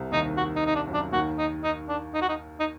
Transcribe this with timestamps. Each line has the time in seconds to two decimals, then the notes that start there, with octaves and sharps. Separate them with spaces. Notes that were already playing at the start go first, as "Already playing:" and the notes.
Already playing: C2 C3
0.12 D#2 D#3 D#4
0.37 F#4
0.56 D#4
0.66 D#4
0.75 D4
0.87 F#2 F#3
0.94 D4
1.13 D#2 D#3 F#4
1.38 D#4
1.64 D#4
1.89 D4
2.14 D#4
2.22 F#4
2.29 D#4
2.60 D#4